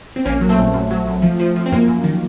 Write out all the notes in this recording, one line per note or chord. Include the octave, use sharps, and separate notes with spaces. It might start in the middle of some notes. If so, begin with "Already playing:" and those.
C4
A#1 A#3 C#4
F#3
A3 C4
A#1
F#2
F#3
F#2
F3
F3
F3
C4
F#2 A#3
F#2
D#3